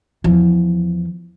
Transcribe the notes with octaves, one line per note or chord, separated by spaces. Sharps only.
E2 F3